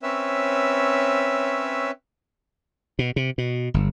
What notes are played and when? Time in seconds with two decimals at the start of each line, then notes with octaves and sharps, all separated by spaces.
0.03 C4 C#4 B4 C#5 E5 E6
2.99 B2
3.16 C3
3.38 B2
3.74 G1